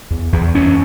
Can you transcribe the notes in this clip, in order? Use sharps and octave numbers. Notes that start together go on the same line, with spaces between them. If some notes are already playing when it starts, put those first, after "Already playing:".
E2
E2
F#2 C#4